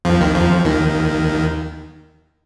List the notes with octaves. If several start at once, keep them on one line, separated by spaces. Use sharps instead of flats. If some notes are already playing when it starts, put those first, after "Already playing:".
F2 F3
D#2 D#3
F2 F3
D#2 D#3